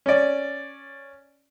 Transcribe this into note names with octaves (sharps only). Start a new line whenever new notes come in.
C#4 D5